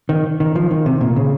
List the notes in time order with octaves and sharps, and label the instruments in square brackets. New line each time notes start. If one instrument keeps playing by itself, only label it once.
[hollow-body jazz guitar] D#3
D#3
F3
D#3
C3
A#2
C#3